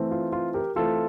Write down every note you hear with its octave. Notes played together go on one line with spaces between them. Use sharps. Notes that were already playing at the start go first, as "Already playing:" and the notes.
Already playing: E3 A3 C4
F4
F4
G4 A#4
E3 A3 C4 F4 A4